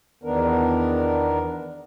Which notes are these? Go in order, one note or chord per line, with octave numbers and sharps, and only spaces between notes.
E2 D#3 B3 D4 A#4